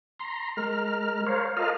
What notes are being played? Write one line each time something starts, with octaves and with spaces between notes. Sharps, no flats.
A#5 C6
G#3 A#4 F6
A#4 C5 C#5 F5
F4 A4 A#4 D#5 F5 F6